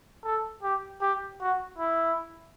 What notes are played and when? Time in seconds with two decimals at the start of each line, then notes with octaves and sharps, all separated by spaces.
0.24 A4
0.63 G4
1.02 G4
1.41 F#4
1.78 E4